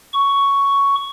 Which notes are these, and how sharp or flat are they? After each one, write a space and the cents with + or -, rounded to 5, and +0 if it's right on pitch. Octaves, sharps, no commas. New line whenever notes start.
C#6 +5